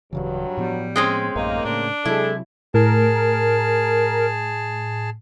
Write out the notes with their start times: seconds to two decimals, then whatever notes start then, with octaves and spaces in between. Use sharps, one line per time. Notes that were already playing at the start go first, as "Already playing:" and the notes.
0.13 D1 G2 C#3 E3 F#3
0.57 A2 F3 G3 B3
0.96 G#3 C4 C#4
1.36 A1 F#2 A2 A#3 D#4
1.65 A2 C#3 D4
2.05 C3 F#3 G#3 E4 A4
2.74 A2 G#4 A#4 A5